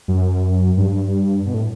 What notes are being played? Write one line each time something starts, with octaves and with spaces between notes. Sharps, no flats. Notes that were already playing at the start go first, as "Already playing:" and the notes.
F#2
G2
B2
A2